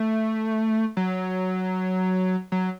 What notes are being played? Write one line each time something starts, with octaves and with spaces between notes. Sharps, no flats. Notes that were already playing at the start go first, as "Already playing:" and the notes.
Already playing: A3
F#3
F#3